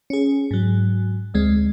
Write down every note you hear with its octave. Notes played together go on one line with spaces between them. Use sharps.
C#4 G#4
G#2 F#3
D2 G#3 C4